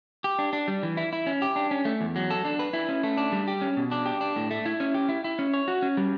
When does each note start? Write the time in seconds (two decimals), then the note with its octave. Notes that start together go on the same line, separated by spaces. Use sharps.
0.24 G4
0.39 D4
0.53 D4
0.68 G3
0.83 E3
0.97 E4
1.13 E4
1.27 C#4
1.42 G4
1.56 D4
1.71 C#4
1.85 A3
2.01 E2
2.16 F#3
2.30 A4
2.45 D4
2.59 B4
2.73 E4
2.89 C#4
3.03 A3
3.17 D4
3.32 G3
3.48 G4
3.62 C#4
3.77 B2
3.91 D4
4.06 G4
4.21 D4
4.36 A2
4.51 A3
4.66 E4
4.80 C#4
4.94 G4
5.09 E4
5.24 E4
5.39 C#4
5.54 C#5
5.68 F#4
5.82 C#4
5.97 G3